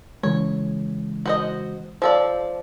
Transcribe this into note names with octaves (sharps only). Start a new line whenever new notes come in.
C#3 E3 G#3 C#5
F#4 C5 D#5
F3 A4 C5 D5 F5